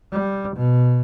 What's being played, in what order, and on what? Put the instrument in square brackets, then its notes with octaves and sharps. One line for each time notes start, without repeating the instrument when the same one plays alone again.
[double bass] G3
B2